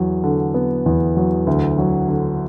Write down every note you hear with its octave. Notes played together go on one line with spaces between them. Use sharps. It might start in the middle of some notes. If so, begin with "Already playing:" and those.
Already playing: E2 F#3
D3
B3
E2
F#3
D2
F#3
D3